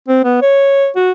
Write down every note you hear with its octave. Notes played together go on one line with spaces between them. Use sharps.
C4
B3
C#5
F#4